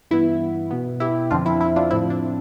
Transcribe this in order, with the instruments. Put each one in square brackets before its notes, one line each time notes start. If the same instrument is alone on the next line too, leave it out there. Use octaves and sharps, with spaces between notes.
[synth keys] G2 E3 B3 E4
B2 B3
E4 G4
F2 D3 F3 C4 D4 F4
E4
E4
D4 F4
A2 F3 C4 E4
D4